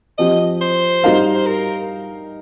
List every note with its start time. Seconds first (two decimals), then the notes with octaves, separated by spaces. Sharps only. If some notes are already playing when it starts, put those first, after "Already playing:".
0.18 F3 C4 G4 D#5
0.61 C5
1.03 G3 D#4 A#4 F5
1.35 C5
1.47 A#4